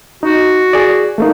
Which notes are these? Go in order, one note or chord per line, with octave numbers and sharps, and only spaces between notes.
D#4 F#4
G#4 D5
A3 A#3 D#4